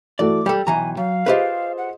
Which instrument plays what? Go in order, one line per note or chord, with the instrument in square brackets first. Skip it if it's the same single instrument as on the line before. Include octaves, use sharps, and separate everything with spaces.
[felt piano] E3 A3 F#4 [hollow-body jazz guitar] D5 [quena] D6
[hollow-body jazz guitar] G3 A4 [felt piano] G5
[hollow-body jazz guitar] B1 E3 A#5 [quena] G#5
[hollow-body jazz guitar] F#3 [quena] F5
[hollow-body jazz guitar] F4 G4 B4 [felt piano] G#4 C5 D#5
[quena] F#5